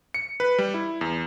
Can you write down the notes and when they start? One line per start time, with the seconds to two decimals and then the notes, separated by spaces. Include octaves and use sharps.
0.14 C#7
0.40 B4
0.58 G3
0.74 E4
1.01 E2